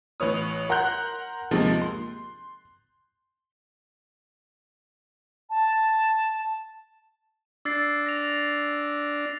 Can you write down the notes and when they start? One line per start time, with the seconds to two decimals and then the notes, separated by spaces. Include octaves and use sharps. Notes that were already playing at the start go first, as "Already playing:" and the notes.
0.20 A1 B4 C#5 D#6
0.69 A#4 F#5 A#5 C6 F#6 G6
1.51 D#2 C3 D#3 F3 G#3 A#3
1.81 C6
5.50 A5
7.65 D4 E6 A6 C7
8.06 A#6 F7